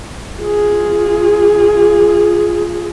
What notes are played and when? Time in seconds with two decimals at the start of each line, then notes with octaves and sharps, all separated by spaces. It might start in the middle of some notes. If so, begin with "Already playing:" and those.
0.40 F4 G#4